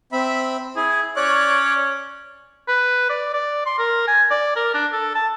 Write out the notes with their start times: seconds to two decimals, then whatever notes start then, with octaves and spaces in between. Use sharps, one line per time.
0.12 C4 E5 B5
0.76 E4 G#4
1.16 C#4 C#5 D5 F#6
2.68 B4
3.09 D5
3.34 D5
3.66 C6
3.78 A#4
4.08 G#5
4.31 D5
4.56 A#4
4.74 D4
4.93 A4
5.15 A5